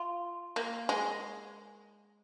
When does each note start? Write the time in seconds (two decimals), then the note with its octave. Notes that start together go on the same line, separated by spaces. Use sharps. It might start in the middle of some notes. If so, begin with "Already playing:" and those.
Already playing: F4
0.56 A#3
0.89 G#3